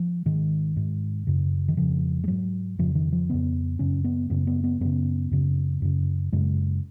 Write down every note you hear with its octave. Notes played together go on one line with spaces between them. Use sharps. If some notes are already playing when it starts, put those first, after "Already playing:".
Already playing: F3
G#2 D#3
G#2
F#2 C#3
D#3
F2 C#3 F3
G#3
G#2 F#3
F2 C#3 F3
D#3
F3
F2 C#3 B3
F#2 C#3 C#4
B3
F#2 C#3 B3
B3
B3
F#2 C#3 B3
F#2 C#3
F#2 C#3
F#2 C#3 G#3